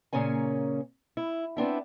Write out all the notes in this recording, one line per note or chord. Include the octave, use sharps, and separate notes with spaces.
A#2 C#3 A#3 C#4 G#5
E4
B3 C4 D4 E4